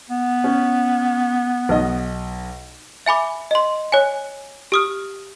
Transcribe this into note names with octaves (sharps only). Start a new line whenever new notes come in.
B3
C#4
B1 D#5
E5 G#5 B5 D6
D#5 C6
C#5 G#5
G4 D#6 F6